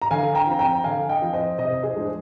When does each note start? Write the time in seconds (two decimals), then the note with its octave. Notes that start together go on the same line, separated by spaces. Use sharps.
0.02 A#5
0.11 D3 F5 G#5
0.35 G5 A#5
0.47 F3 C4
0.59 G5 A#5
0.84 D3 F5 G#5
1.09 D#5 G5
1.22 F3 C4
1.33 C5 D#5
1.58 C3 C5 D#5
1.82 G#4 C5
1.96 F3 G#3 D4 C5